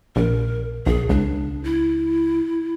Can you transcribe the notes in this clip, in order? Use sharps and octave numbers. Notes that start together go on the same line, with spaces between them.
A#1 A#4
B1 G#4
C#2 D4
E4